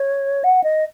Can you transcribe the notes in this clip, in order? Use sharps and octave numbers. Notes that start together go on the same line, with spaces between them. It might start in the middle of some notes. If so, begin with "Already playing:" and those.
Already playing: C#5
F#5
D#5